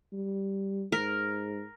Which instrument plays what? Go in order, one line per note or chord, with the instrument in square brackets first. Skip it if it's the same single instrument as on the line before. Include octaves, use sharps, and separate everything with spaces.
[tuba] G3
[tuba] G#2 [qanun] A#4